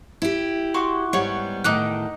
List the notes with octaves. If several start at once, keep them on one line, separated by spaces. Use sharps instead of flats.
E4 G4
F#4 C6 D6
G#2 G3 B3 C#5 F#5
E2 A2 D#3 D#4 D6 F#6